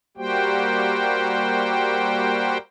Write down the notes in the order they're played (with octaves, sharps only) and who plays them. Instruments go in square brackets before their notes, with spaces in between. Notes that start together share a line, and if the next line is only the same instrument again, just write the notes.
[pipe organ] G3 A#3 F#4 G4 C5 G5